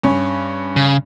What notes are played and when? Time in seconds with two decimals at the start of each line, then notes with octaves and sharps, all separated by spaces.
0.03 G2 C#4
0.76 C#3